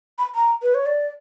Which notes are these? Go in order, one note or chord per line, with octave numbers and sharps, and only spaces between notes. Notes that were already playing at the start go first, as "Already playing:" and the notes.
B5
A#5
B4
C#5
D5